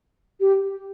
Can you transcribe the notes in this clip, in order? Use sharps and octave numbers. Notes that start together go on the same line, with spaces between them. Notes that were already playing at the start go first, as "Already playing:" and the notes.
G4